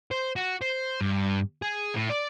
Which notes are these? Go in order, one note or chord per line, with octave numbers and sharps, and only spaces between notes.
C5
F#4
C5
G2
G#4
A2
D5